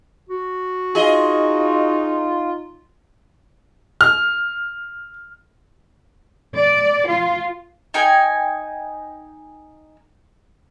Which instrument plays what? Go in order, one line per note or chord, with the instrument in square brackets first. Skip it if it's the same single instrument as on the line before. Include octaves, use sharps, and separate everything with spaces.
[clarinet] F#4
[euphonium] D#4 [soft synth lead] F4 [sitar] G#4 D#5
[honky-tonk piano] F6
[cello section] D5
F4
[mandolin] D#4 G5 G#5